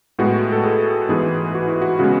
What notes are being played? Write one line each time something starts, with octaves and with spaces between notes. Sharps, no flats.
A2 G#3 B3 F#4
A4
G#4
G#2 E3 B3 G#4
F#4
E4
F#4
C#3 G#3 B3 F#4